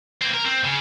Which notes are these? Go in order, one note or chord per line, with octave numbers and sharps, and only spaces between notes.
A#3 C4
A#4
C4
C#3